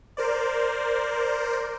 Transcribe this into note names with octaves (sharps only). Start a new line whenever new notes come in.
A#4 C5 D5